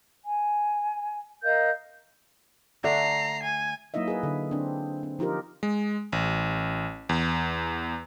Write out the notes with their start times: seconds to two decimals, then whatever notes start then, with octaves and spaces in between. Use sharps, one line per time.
0.24 G#5
1.44 A#4 D#5 F5 G6
2.84 D3 A3 D4 A#5 C7
3.43 G#5
3.94 F#3 A#3 D#4 E4 D#5 E5
4.08 G#4 B4
4.23 D3
4.51 C4 D4
5.03 C4
5.19 F3 D#4 F4 G4 A#4
5.63 G#3
6.12 A1
7.09 E2